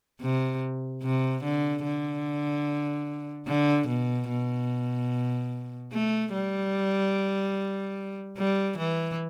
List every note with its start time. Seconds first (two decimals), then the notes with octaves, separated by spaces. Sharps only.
0.22 C3
1.03 C3
1.43 D3
1.84 D3
3.47 D3
3.88 B2
4.29 B2
5.92 A3
6.33 G3
8.37 G3
8.78 E3